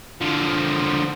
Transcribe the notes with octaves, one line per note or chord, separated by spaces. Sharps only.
D3 F3